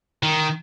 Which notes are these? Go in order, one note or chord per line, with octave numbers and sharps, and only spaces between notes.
D#3